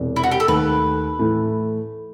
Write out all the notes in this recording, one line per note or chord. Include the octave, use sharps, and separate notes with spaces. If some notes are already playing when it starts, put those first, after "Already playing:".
Already playing: E1 E2 C3
E4
F#4
G4
A4
D#2 D#3 A3 B4
A2 E3 A3 E4